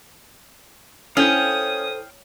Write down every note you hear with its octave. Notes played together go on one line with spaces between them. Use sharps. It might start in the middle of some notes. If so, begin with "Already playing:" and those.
C#4 E4 A4 C5 F5 G5 D#6